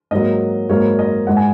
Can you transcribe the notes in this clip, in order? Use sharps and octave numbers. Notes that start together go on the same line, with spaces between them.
G#2 F#3 A#3 D#5
G#2 F#3 A#3 C#5
D#5
G#2 G#3 F#5
G#5